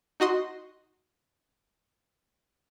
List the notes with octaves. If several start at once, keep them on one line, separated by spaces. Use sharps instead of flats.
D#4 F#4 D#5 C6